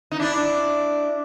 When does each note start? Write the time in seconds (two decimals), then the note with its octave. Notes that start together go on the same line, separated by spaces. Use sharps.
0.12 D#4
0.19 D4 E4